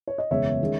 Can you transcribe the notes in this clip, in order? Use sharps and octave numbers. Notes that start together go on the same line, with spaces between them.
C#5
D#5
F#1 E2 B2 G#3 C#5 E5
D#3 G#3 C#4